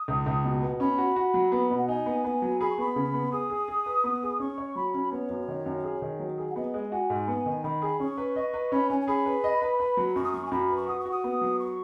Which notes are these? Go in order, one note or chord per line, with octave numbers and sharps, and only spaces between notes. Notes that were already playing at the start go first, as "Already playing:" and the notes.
Already playing: D#6
C#2
C#2
B2
B3
C#4 B5
F#4
F#4
F#3
B3
B2
F#5
D#4 G#5
B3
B3
F#3
G#4 B5
C#6
B3 B5
C#3
B3
G#4 D#6
G#4
G#4
B4
B3
G#4
C#4 C#6
C#5
F#3 B5
C#4
B3 C#5
F#2
D#3
F#2
G#4
D#3
F#3
G#4
F#5
B3 D#5
G#3
F#4 G#5
G#2
B3
D#3
D#3 B5
G#4
C#4 C#6
B4
D#5
B4
C#4 B5
C#4 G#5
G#5
G#4 B5
B4
D#5
B4
B4
F#3
F#2 C#6
D#6
F#3 C#6
G#5
F#2 B5
B4
C#6
F#4 D#6
C#6
F#4
D#6
B3
F#3
C#6